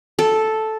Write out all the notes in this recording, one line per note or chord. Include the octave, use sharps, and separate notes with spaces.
A4